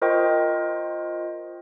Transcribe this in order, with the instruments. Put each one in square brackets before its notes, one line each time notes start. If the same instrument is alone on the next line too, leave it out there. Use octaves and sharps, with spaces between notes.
[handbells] F4 A#4 C5 D#5 G5 C#6